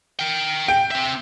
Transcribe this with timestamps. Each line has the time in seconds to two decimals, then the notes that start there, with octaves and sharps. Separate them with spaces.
0.19 A#4 G5
0.68 G5
0.91 C4 E5